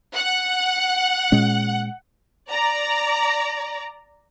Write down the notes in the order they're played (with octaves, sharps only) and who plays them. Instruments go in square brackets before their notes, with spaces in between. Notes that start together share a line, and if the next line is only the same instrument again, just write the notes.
[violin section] F#5
[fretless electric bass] A#2 G#3 C#4
[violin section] D5 A#5